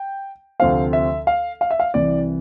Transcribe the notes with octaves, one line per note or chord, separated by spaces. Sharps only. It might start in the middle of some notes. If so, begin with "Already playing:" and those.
Already playing: G5
D2 C3 F3 C4 F5
E5
F5
F5
E5
F5
C2 C3 E3 D5